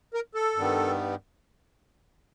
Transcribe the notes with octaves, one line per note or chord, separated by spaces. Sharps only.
A#4
A4
G2 D#3 G3 B3